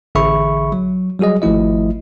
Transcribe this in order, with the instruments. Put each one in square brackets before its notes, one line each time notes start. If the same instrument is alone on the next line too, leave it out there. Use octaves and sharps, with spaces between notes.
[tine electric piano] A1 D3 G#4 E5 B5 C#6
F#3
F#3 G3 F#4 G#4 D#5
G#1 F3 A3 E4 D#5